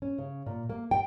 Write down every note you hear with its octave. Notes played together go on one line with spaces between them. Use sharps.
C#4
C#3
A#2
A#3
G5